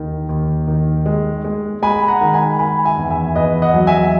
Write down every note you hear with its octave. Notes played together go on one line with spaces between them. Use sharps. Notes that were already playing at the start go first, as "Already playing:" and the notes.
Already playing: D#2 D#3
D#2
D#3
G#3
G#3
G#3 G#5 B5
F#5 A#5
D#3
G#5 B5
D#3 G#5 B5
E5 G#5
E2
E5 G#5
E2 B4 D#5
D#5 F#5
F#3
E5 G#5